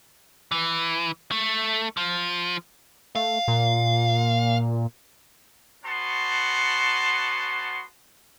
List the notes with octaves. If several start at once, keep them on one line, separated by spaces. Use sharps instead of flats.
E3
A3
F3
A3 F5
A#2
B3 C#4 F#4 A5 C6